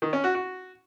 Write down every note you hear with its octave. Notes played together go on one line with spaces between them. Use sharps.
D#3
C#4
F#4
F#4